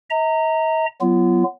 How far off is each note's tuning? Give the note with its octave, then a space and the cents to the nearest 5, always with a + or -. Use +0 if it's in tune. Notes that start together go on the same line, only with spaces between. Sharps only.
D#5 +45 A#5 -20
F#3 +5 B3 +0 F4 -35